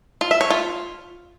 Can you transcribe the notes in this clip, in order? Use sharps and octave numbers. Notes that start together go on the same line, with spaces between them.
F4
E5
C#5
F4